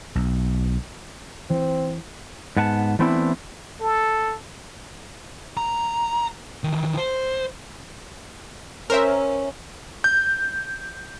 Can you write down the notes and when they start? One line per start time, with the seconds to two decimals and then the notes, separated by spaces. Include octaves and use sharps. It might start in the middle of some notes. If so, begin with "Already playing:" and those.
0.15 B1
1.50 E3 C4
2.57 G#2 B3 F#5 G#5 A5
2.99 E3 A3 B3 C4 D4 E4
3.81 A4
5.57 A#5
6.64 D#3 E3
6.97 C5
8.90 C#4 A#4 C5 E5
10.04 G6